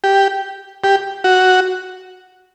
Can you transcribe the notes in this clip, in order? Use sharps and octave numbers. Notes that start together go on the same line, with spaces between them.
G4
G4
F#4